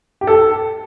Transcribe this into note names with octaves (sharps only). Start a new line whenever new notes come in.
G4
A4